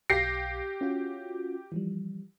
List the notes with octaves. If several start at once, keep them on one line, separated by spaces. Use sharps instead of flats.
B1 G4 F5 A#6 C7
C#4 F4 F#4
E3 F3 G3